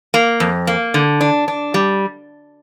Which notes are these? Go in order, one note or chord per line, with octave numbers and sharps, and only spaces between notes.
A#3
F2
A#3
D3
D4
D4
G3